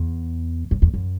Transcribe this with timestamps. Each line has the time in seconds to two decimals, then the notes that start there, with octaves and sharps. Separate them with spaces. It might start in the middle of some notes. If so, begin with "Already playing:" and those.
Already playing: E2
0.71 F#2
0.82 E2
0.94 F#2